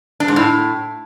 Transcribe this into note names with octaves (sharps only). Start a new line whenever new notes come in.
D4
G#2
A2